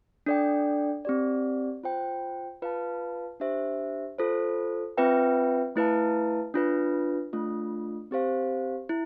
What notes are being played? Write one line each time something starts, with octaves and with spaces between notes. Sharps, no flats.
D4 A4 D5 G5
C4 G4 D5
F4 C5 G5
F4 B4 F5 A5
D4 G4 C5 E5
F4 A4 C5
C4 F4 B4 E5 G5
A3 E4 B4 F5 A5
D4 F4 B4
A3 D4 F4
C4 G4 C5 F5
E4